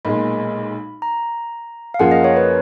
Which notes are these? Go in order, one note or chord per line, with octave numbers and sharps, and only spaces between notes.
B1 A#2 G#3 B5
A#5
F5
F#2 F3 A#3 F4 G#4 F#5
D#5
C#5
B4